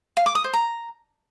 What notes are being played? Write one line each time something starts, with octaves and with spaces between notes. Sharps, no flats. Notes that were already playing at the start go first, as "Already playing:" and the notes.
F5
D6
D#6
C5
A#5